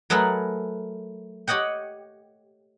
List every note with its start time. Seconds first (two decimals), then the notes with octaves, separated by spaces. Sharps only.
0.10 F#3 A3 G#4 A#4 B4 F#5
1.47 G4 C#5 D#5 F#5 G5